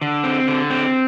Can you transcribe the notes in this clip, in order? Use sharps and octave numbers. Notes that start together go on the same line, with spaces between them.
D3
C4
D3
C4